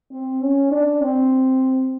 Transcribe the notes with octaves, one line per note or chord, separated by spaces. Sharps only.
C4
C#4
D4
C4